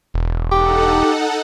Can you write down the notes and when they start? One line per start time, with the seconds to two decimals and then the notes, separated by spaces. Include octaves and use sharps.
0.14 E1
0.52 D#4 G4 A4 F#5